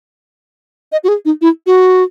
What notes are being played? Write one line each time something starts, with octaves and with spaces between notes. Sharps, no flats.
D#5
F#4
G#4
D#4
E4
F#4